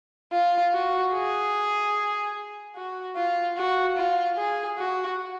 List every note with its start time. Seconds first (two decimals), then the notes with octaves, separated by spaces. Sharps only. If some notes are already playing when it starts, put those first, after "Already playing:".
0.32 F4
0.73 F#4
1.14 G#4
2.76 F#4
3.16 F4
3.57 F#4
3.97 F4
4.37 G#4
4.78 F#4